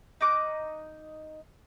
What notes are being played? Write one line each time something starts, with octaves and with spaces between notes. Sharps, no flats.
D#4 D#5 D6 F#6